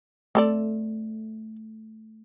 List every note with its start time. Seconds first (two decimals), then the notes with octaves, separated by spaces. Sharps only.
0.35 A3 C4 A4 D5